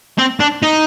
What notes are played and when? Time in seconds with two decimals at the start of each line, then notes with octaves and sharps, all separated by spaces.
0.19 C4
0.40 D4
0.62 D#4